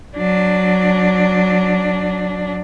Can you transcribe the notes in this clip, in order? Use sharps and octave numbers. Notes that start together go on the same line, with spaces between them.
F#3 D4